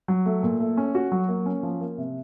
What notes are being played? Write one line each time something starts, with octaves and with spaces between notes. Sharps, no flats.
F#3
A3
A#2
A3
C#4
F#4
F#3
A#3
C#4
F3
A#3
C3